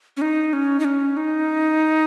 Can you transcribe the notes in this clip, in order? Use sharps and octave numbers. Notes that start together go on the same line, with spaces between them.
C#4
D#4
C#4
D#4
C#4
D#4